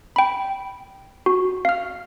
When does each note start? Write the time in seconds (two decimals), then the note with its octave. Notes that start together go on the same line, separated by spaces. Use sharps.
0.16 G5 B5
1.26 F#4
1.65 F5 F6